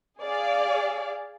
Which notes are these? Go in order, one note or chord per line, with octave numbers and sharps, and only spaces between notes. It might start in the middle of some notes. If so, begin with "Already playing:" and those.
G#4 D5 F5